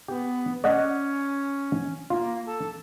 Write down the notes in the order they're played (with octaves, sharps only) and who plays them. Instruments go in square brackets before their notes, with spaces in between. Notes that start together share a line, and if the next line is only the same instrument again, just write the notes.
[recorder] B3 [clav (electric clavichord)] G4
[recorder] C#4 [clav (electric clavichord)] D5 D#5 F#5
[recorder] A#3 [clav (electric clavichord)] F4
[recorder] A4